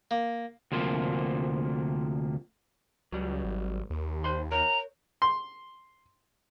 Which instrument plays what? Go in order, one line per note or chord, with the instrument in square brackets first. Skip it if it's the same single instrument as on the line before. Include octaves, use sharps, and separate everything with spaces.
[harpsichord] A#3
[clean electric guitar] D2 C3 F3 A#3
[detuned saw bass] C#2 [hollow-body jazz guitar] F#3 G3
[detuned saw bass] G#1
D#2
[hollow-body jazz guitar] C5 B5 C6
[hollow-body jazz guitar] A#4 C#5 [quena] A#5
[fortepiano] C6